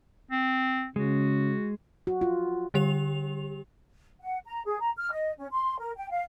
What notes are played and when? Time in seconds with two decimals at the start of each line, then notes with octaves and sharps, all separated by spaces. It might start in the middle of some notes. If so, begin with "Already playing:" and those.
0.31 C4
0.96 C#3 G#3 F#4
2.07 F#4
2.21 F4
2.74 D3 G3 G4 F7
4.21 F#5
4.46 A#5
4.65 G#4
4.80 A#5
4.97 F6
5.11 D#5
5.38 C#4
5.52 C6
5.79 A#4
5.97 G5
6.11 F5